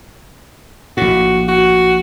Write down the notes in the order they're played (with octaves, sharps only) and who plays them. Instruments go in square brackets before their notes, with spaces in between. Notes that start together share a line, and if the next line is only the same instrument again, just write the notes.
[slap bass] A#1 A2 [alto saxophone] F#4
[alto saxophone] F#4